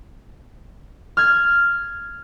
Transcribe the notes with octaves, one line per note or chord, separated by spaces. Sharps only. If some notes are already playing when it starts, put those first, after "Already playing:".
F6 G#6